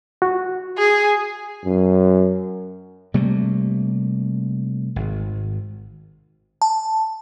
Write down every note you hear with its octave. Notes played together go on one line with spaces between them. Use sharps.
F#4
G#4
F#2
C3 G3 A3 A#3
G#1
A5